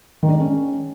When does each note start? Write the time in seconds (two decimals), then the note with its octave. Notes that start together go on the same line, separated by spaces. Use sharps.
0.23 D#3
0.28 D4
0.34 G#3
0.40 C#4